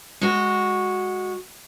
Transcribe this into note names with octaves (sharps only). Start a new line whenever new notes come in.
G#3 F#4